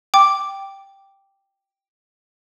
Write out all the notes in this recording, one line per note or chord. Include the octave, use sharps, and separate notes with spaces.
G5 D6